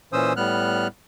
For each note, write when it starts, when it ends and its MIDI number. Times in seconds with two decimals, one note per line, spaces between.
0.13 0.33 46
0.13 0.33 52
0.13 0.33 61
0.13 0.33 72
0.13 0.33 87
0.13 0.33 88
0.37 0.87 45
0.37 0.87 55
0.37 0.87 59
0.37 0.87 89
0.37 0.87 90